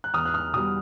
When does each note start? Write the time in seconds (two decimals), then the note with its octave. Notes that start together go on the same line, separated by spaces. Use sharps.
0.04 F#6
0.14 E2 D#6 F6
0.25 F#6
0.34 D#6 F6
0.53 B2 G3 D#6 F6